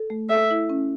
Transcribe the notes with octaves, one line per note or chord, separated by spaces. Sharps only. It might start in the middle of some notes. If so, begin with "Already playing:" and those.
Already playing: A4
A3
A4 E5
E4
C#4